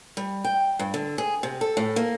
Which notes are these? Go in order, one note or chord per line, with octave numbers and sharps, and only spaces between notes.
G3
G5
G2
D3
G#4
C3
A4
A2
A#3